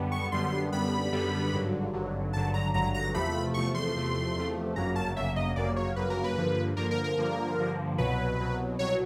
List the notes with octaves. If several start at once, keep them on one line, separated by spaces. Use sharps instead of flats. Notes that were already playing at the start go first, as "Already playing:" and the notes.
Already playing: F#2 D3 G3 B3
C#6
F#2 D3 G3 B3 C6
F#2 D3 G3 B3 B5
F#2 D3 G3 B3
G#1 G2 D3 F#3
G#1 G2 D3 F#3
G#1 G2 D3 F#3 A5
A#5
G#1 G2 D3 F#3 A#5
A#5
E2 C3 F3 A3 B5
E2 C3 F3 A3 C#6
C6
E2 C3 F3 A3
E2 C3 F3 A3
G1 F#2 C#3 F#3 A#3 A#5
A5
G1 F#2 C#3 F#3 A#3 E5
D#5
G1 F#2 C#3 F#3 A#3 D5
C#5
G1 F#2 C#3 F#3 A#3 B4
A#4
B4
G2 D3 F3 A#3
G2 D3 F3 A#3 A#4
A#4
A#4
G2 D3 F3 A#3
G2 D3 F3 A#3
C2 B2 F#3 B4
C2 B2 F#3
C2 B2 F#3 C#5